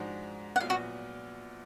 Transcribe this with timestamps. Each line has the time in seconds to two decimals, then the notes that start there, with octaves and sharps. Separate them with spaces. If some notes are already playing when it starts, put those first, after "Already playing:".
Already playing: G#2 F3 G#3 D4 F#4
0.56 F#5
0.60 A#1 A#2 F#3 B3 F5
0.70 F#4